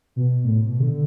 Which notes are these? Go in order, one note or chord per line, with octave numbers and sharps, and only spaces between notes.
B2
A2
B2
D3